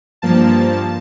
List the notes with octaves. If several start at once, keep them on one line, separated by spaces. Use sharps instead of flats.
G2 F3 A#3 A5